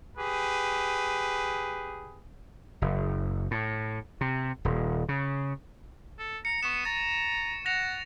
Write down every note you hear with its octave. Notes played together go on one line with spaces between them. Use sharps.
G4 G#4 B4
F#1
A2
C3
D#1
C#3
A4
A#5 C#7
B3 C#6 E7
A#5 A6
F#5 A#6 F7